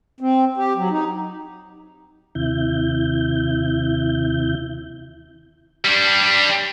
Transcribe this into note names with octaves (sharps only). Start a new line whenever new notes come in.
C4
G4
F#3
D#4
D#2 C3 E4 G6
G3 D4